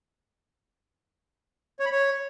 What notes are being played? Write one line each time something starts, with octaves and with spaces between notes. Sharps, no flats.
C#5
B5
C#5